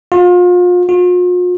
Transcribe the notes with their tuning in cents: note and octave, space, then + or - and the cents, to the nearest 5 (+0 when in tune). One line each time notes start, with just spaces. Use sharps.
F4 +35
F4 +45